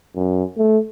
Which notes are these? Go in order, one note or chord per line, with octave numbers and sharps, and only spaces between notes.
F#2
A3